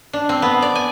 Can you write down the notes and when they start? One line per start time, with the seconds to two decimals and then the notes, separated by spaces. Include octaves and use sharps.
0.13 D4
0.29 C4
0.42 B3
0.62 D5
0.75 G#5